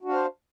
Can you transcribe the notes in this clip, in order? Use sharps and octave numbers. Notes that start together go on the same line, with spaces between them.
D4 F#4 C5 F5